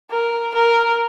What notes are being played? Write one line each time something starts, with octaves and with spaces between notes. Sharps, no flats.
A#4
A#4